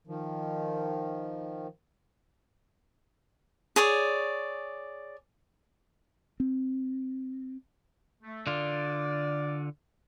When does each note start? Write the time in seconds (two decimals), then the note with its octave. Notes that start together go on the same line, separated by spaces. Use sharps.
0.07 D#3 F3
3.76 G#4 C#5 D5
6.40 C4
8.23 A3
8.47 D3 F4 D5